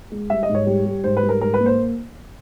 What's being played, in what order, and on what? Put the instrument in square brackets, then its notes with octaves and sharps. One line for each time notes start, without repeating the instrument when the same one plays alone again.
[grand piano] G#3
[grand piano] G3 [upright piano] E5
[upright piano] D#5
[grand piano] G#2
[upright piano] C#5
[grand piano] G3
G3
[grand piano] G#2 [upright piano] C5
[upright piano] B4
[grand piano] G3
[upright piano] A#4
[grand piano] G#2 [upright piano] A#4
[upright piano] B4
[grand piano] A#3
[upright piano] C5